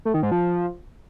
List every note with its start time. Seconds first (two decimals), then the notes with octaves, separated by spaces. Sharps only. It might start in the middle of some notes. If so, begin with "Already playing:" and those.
0.05 A3
0.14 D#3
0.23 G#2
0.32 F3